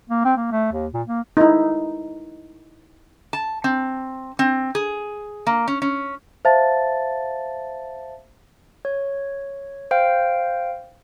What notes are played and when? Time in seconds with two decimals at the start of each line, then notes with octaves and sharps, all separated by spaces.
0.10 A#3
0.25 C4
0.37 A#3
0.51 A3
0.72 D#2
0.94 A#2
1.07 A#3
1.37 D#4 E4
3.33 A5
3.64 C4
4.39 C4
4.75 G#4
5.47 A#3
5.68 C#4
5.82 C#4
6.45 C5 E5 F5 A5 A6
8.85 C#5
9.91 C5 F5 G5 D7